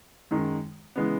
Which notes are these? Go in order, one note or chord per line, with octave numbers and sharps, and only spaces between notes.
F#2 D#3 G#3
C#3 E3 G#3 B3